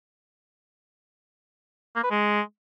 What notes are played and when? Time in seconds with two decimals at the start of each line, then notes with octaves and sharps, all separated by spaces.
1.96 A#3
2.03 B4
2.11 G#3